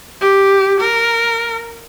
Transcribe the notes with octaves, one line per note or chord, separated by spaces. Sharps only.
G4
A#4